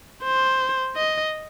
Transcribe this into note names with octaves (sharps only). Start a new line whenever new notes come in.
C5
D#5